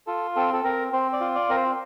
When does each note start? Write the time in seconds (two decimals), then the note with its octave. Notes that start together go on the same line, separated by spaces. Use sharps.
0.07 F4 A4
0.36 C4 A4
0.54 A4
0.64 C4 A#4
0.93 C4 C5
1.13 D5
1.21 F4
1.35 D5
1.49 C4 A#4
1.56 C5